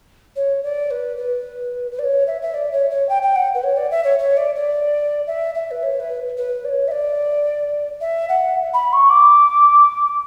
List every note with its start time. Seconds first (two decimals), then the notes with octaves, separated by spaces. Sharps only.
0.36 C#5
0.63 D5
0.90 B4
1.17 B4
1.91 B4
1.99 D5
2.04 C#5
2.27 E5
2.42 E5
2.54 D5
2.72 C#5
2.90 C#5
3.09 G5
3.22 G5
3.35 F#5
3.54 B4
3.63 C#5
3.77 D5
3.91 E5
4.04 C#5
4.19 C#5
4.37 D5
4.55 D5
5.27 E5
5.54 E5
5.71 B4
5.83 C#5
6.00 B4
6.37 B4
6.64 D5
6.69 C#5
6.88 E5
6.91 D5
8.01 E5
8.29 F#5
8.73 B5
8.93 C#6
9.10 D6